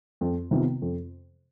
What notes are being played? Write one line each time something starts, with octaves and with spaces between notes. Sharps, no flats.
F2
C3 D#3 B3 F4
F2